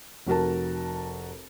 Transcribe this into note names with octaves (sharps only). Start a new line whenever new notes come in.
F1 F#4 A#4 A5